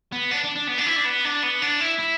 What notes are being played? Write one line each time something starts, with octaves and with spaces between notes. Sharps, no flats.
B3
D4
D4
D4
B3
D4
E4
D4
B3
D4
B3
D4
E4
E4